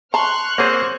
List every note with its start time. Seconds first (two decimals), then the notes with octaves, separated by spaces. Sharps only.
0.14 A5 A#5 C6 C#6 F6 F#6
0.58 A#3 C4 G#4 C5 C#5 F#5